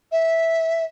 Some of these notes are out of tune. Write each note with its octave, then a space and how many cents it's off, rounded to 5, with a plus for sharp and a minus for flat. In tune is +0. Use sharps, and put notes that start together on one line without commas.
E5 -10